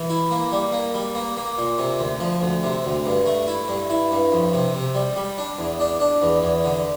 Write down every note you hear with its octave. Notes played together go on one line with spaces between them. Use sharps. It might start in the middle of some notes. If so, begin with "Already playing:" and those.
Already playing: E3
E4
A#3
G3
A#3
G3
A#3
A#3
A#2
C3
D2
F3
D2
C3
D2
G2
A3
E4
G2
E4
G2
F2
C3
C3
G3
G3
D4
E2
D4
D4
E2
E2
D3